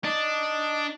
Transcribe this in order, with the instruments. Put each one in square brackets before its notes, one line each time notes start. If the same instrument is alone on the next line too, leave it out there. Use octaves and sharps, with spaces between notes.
[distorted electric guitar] D4 [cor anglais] D#4